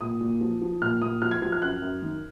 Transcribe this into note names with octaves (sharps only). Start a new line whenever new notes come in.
A#2 D#6
A#2
F3
F3
A#2 F6
A#2 D#6
F3 F6
G#6
F3 G#6
F6
F#2 F#6
F#2
D#3